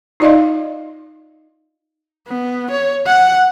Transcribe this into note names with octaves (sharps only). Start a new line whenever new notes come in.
D#4 F4 D5 D#5 F5 C6
B3
C#5
F#5